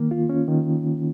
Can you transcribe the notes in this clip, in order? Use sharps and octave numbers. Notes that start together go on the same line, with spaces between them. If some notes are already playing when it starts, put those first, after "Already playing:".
Already playing: D#3 A#3
F4
C#4
D#3